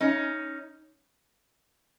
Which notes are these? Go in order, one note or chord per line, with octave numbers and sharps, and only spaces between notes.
C#4 D#4